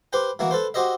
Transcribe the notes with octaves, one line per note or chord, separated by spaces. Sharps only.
G4 B4 C5 G5
E3 A#3 E4 F#4
A4 B4 C5
F#4 G4 C5 D#5 E5